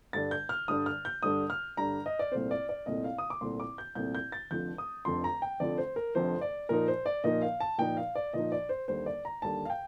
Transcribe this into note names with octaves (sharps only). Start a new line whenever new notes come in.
G2 D3 G3 D4 A6
G6
F6
G2 D3 G3 D4 D#6
F6
G6
G2 D3 G3 D4 D#6
F6
G2 D3 G3 D4 A#5
D#5
D5
C2 A#2 A3 C4 C5
D5
D5
C2 A#2 A3 C4 D#5
F5
D#6
D6
C2 A#2 A3 C4 C6
D6
G6
C2 A#2 A3 C4 G6
G6
A6
F1 F2 D3 F3 G6
D#6
F1 F2 D3 F3 C6
A#5
G5
F1 F2 D3 F3 D5
C5
A#4
F1 F2 D3 F3 C5
D5
A#2 F3 A#3 D#4 A#4
C5
D5
A#2 F3 A#3 D#4 D#5
F5
A5
A#2 F3 A#3 D#4 G5
F5
D5
A#2 F3 A#3 D#4 D#5
D5
C5
D#2 D3 G3 C5
D5
A#5
D#2 D3 G3 A5
F5
G5